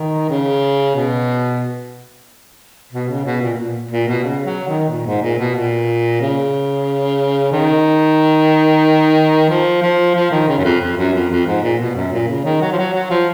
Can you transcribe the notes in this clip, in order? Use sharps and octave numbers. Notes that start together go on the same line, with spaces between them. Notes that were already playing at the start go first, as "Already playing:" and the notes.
Already playing: D#3
C#3
B2
B2
C#3
B2
A#2
A#2
A#2
B2
C#3
F#3
D#3
A#2
G#2
A#2
B2
A#2
C#3
D#3
F3
F3
F3
D#3
C#3
F#2
F2
F2
F#2
F2
F2
G#2
A#2
B2
F#2
A#2
C#3
D#3
F#3
F3
F#3
F#3
F3